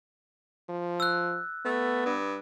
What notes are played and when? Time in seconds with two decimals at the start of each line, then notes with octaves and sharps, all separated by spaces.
0.69 F3
1.00 E6 F#6
1.65 A3 B3
2.06 G2